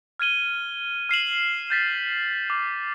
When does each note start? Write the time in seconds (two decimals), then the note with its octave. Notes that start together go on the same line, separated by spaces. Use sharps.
0.20 F6 G#6 D#7 G7
1.09 F6 C7 E7 F#7
1.70 G6 A6 B6
2.50 D6